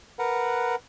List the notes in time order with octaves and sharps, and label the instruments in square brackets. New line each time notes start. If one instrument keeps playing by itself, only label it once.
[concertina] A#4 B4 F#5